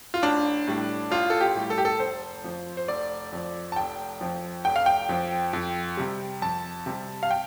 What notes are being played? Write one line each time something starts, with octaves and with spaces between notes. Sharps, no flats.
F4
A1 D4
A2 G3
A1 F4
A4
G4
A2 G3
A4
G4
A4
F1 C5
F2 F3
C5
F1 D5
F2 F3
A5
F1 G5
F2 F3
F1 G5
F5
G5
F2 F3
F2
C3 G3
F2 A5
C3 G3
F5
G5